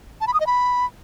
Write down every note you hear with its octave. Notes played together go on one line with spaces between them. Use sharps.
A5
B5
D#6
D#5
B5